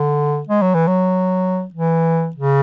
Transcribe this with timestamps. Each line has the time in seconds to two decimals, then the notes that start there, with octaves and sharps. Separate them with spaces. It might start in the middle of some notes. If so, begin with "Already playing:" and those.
Already playing: D3
0.49 G#3
0.62 F#3
0.75 E3
0.88 F#3
1.74 E3
2.36 C#3